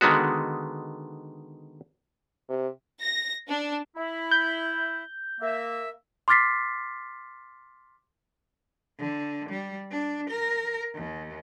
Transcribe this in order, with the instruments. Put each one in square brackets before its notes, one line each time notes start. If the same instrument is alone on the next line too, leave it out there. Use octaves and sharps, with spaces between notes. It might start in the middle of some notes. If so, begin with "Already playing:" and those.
[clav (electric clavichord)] D3 D#3 G#3 B3 F#4
[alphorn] C3
[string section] A#6
D4
[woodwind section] E4
[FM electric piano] G6
[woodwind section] A#3 E5
[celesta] C6 D6 F6 A6 B6 C7
[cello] D3
G3
D4
A#4
D#2